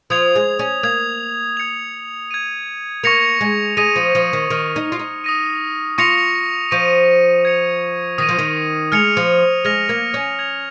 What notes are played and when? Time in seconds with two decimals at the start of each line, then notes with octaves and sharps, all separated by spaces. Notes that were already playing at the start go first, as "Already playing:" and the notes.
0.10 F3 D#6 G#6 F7
0.35 G#3
0.59 C#4
0.83 A#3 D#6 G#6 F7
1.57 G#6 C#7 F7
2.31 G#6 D#7
3.03 A#3 C#6 A#6 C#7 F7
3.41 G#3
3.77 G#3 D#6 A#6 D#7
3.96 F3
4.15 F3
4.33 D#3
4.50 D#3 F6 A#6 D#7
4.76 D#4
4.92 F4
4.99 D#4
5.24 D#6 A#6 D#7
5.98 F4 C#6 A#6 C#7 F7
6.71 F3 C#6 A#6 D#7
7.45 G#6 C#7 F7
8.18 D#3 D#6 A#6 D#7
8.29 F3
8.39 D#3
8.92 G#3 F6 C#7 F7
9.17 F3
9.65 G#3 F6 A#6 F7
9.89 A#3
10.14 C#4
10.39 G#6 F7